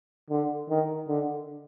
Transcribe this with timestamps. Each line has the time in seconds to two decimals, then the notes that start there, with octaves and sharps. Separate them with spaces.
0.30 D3
0.69 D#3
1.08 D3